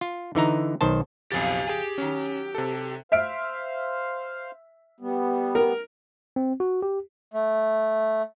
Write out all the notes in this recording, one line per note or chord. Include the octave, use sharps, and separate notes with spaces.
F4
D3 E3 D#4 A#5
B1 D#3 C5 A5
B1 F2 C#3 F3 G4 F5 G#5 A6
G4 G#4
D#3 F#3 C#4
C3 A4
C5 E5 F5 F6 D7
G3 B3
A#4
C4
F#4
G4
A3